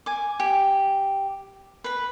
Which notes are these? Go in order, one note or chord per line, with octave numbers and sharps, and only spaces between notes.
G#5 D6
G4
B4 B5